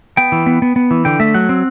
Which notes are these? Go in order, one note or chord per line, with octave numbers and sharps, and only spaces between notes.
B3 G5
E3
B3
B3
B3
E3
D3 G5
A3 E5
F#3 F#5
C4